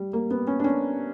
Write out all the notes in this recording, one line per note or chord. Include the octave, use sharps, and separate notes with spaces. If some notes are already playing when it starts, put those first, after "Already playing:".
Already playing: G3
A#3
B3
C#4
D4
C#4